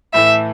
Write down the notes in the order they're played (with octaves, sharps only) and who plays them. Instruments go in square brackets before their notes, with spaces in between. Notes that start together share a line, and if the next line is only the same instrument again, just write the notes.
[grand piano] A2 E3 A3 [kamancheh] E5